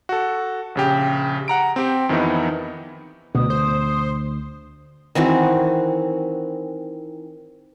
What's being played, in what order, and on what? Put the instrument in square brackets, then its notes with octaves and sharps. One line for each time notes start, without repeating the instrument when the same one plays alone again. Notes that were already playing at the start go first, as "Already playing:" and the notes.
[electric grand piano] F#4 A4
A#1 C#3 G4
F#5 A#5 D7
C4 G4
F2 D#3 E3 B3 D#4 E4
[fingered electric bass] D2 [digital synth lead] B2 [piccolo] D#6
[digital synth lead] C5
[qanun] D#3 E3 C4 F#4